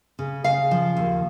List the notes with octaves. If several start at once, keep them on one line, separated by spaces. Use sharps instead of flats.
C#3
C#3 F5
F3
D#2